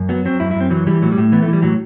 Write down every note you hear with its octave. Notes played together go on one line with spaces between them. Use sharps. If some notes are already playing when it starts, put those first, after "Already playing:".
Already playing: F#2
F#3 B3
F#3 C4
F#2 E4
E4
F#2 C4
E3 F#3
E3 G3
A2 F#3
G3
A2
E3 B3
A3
E3
G3
A2 F#3